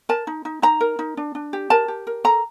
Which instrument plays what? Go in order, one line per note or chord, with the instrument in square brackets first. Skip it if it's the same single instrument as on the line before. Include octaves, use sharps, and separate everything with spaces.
[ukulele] A#4 A5
D#4
D#4
D#4 A#5
A#4
D#4
D4
D4
G4
A#4 A5
G4
A#4
A4 A#5